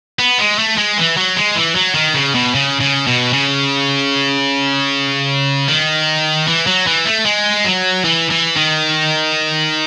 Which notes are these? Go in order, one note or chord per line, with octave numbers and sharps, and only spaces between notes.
B3
G#3
A3
G#3
E3
F#3
G#3
E3
F#3
D#3
C#3
B2
C#3
C#3
B2
C#3
D#3
E3
F#3
E3
A3
G#3
F#3
E3
E3
D#3